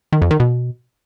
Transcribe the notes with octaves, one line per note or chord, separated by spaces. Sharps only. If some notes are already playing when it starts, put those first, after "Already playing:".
D#3
F2
D#3
B2